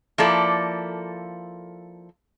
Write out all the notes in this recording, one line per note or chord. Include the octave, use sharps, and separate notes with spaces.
F3 A#3 E4 A4 D5